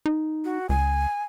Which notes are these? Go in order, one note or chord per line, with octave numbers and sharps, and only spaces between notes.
D#4
F#4
C#2 G#5